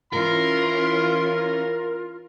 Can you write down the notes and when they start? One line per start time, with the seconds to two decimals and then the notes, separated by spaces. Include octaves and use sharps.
0.13 E3 C#4 F4 A#4 C6